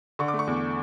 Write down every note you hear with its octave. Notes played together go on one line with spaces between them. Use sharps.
D3 C#6
D6
A3
C#6
E2